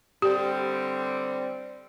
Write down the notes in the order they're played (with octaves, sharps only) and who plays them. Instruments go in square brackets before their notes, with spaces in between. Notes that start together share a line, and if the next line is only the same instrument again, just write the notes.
[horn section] D3 G3 C4 [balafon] G4